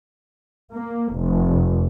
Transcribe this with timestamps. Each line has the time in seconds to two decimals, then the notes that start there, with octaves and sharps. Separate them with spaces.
0.73 A#3
1.17 F1